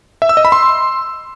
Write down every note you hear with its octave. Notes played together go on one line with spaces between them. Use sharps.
E5
E6
D#5
B5
C6